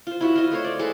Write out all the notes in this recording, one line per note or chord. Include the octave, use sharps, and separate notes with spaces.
F4 C5
E4 F#4 E5
F4 D#5
A3 C5 C#5
D5
G#3 A4 B4